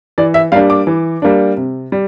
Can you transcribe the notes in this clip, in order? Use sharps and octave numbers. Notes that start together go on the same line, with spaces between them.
E3 D5
E5
G3 A#3 D4 F5
D6
E3
G3 A#3 D4
C3
G3